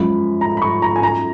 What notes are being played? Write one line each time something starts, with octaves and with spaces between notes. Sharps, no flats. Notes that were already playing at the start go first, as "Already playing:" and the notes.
Already playing: F#2 F3 G#3 B5
A#5
B5
C#6
A#5
G#5
A#5